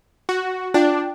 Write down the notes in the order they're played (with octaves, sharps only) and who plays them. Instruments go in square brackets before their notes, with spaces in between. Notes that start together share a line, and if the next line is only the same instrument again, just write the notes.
[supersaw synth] F#4
[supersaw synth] D4 [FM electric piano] F4 G5